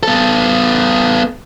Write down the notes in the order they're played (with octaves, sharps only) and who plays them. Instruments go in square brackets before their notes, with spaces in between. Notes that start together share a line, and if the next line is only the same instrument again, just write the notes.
[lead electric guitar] B3 A4